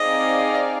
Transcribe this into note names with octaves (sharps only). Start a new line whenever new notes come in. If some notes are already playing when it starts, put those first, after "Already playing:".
Already playing: C4 D#4 G#4 D5 D#5 F5